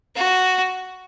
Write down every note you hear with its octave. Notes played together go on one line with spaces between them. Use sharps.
F#4